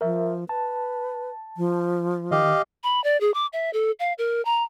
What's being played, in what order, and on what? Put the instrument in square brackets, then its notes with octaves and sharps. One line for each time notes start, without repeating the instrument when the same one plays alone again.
[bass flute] F3 [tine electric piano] A#4 E5
[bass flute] B4 [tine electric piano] A5
[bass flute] F3
[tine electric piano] D#3 [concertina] G4 D#5 F5
[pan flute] B5
D5
G#4
D6
E5
A4
F5
A#4
A#5